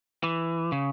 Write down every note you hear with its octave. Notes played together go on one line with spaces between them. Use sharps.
E3
C#3